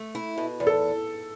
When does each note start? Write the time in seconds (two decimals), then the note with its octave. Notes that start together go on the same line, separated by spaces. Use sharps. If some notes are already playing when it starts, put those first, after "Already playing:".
Already playing: A3
0.15 E4
0.38 B2
0.60 E2
0.67 A4